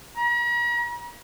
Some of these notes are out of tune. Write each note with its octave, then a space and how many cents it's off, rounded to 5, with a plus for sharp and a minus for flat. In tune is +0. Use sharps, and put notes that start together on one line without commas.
A#5 +45